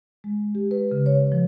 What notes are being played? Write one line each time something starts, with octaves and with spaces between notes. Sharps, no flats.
G#3
G4
B4
C#3
C#5
F3